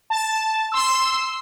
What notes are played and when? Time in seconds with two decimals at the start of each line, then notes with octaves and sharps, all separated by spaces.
0.10 A5
0.72 C6 E6